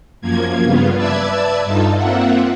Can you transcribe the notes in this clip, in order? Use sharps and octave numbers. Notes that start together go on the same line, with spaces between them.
F#2 F3 A#3 G#6
G2 C#3 B3 F4
B4 D5 E5 A5 E6 G#6
G2 D#4 F4 A4
A#3 C4 F4 E5 F#5